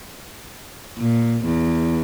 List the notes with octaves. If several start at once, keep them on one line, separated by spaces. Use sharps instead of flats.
A#2
E2